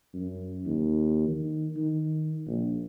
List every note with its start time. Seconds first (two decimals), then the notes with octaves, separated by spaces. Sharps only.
0.14 F#2
0.66 D#2
1.28 D#3
1.76 D#3
2.46 A#1